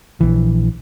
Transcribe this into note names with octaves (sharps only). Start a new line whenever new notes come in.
A#1 E3